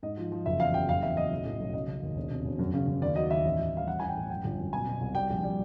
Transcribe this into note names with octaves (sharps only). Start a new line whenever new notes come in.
G#2 D#5
F3
F3
F#1 E5
E2 F5
F#1 G5
F#1 F5
E2 E5
F#1 D#5
B1
A2
B1
C#3 D#5
C#3
D#2
E1
C3
E1
F#2
C#3
C#3
D#2 D5
F#3 D#5
D#2 E5
A1
A1
G3 F5
A1 F#5
A1 G#5
G5
A2
F#2 G5
G1
F#2
B2 G#5
B2
C2
G3 G5
A#1
G3